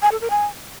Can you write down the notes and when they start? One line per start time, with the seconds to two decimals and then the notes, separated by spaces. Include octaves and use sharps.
0.02 G#5
0.12 A4
0.21 A#4
0.30 G#5